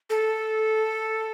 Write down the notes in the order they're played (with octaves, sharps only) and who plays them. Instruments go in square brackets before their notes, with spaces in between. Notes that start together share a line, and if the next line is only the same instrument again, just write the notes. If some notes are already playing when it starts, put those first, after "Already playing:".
[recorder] A4